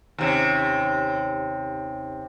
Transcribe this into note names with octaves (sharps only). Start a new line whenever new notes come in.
D#2 C3 C#4